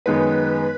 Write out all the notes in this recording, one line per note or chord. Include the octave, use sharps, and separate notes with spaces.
F#2 D#3 G#3 B3 D#4 B4